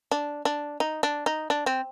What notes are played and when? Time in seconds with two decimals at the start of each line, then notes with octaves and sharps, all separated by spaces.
0.11 D4
0.45 D4
0.80 D#4
1.03 D4
1.26 D#4
1.50 D4
1.66 C4